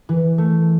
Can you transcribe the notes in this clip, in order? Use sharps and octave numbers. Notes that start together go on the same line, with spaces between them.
E3
A3